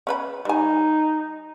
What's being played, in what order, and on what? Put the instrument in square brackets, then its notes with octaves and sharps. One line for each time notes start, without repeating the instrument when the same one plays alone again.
[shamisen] C#4 B4 B5
[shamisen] G3 G#5 [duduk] D#4